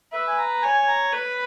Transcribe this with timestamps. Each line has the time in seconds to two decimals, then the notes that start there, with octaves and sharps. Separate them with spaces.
0.12 B4 E5
0.27 G#5
0.38 A#5
0.62 C#5 G#5
0.88 A#5
1.12 B4 B5